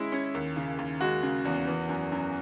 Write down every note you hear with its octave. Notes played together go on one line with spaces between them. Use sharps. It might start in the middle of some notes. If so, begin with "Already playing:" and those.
Already playing: G#3 C#4 E4
C#4
D#2
C#3
D#2
G#3 F#4
C#3
E2
E3
F#2
F#2